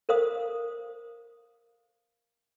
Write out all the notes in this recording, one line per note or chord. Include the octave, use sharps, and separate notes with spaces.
A#4 C5 F5 D#6